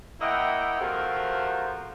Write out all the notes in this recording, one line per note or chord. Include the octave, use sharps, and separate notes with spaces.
A#3 E4 D#5 E5 F#5 G5
C3 F3 A3 F#4 A#4